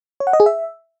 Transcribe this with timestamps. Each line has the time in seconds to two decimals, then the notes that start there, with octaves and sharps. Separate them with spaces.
0.20 C#5
0.27 F#5
0.33 D#5
0.40 G#4
0.46 E5